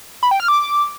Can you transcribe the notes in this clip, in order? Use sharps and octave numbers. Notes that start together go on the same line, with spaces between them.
B5
G5
F6
D6